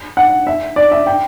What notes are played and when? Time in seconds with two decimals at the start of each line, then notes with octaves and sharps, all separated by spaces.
0.17 F#5
0.47 E5
0.76 D5
0.91 E5
1.07 G5